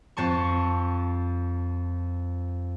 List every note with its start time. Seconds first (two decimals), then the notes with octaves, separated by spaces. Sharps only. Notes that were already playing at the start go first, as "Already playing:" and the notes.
0.17 F2 C4 A5 C#6